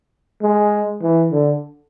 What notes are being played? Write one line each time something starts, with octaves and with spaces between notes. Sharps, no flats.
G#3
E3
D3